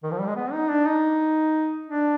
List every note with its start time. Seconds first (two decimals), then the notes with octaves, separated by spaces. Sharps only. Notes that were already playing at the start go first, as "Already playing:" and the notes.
0.03 D#3
0.11 F3
0.20 G3
0.28 G#3
0.36 B3
0.52 D#4
0.69 D4
0.86 D#4
1.87 D4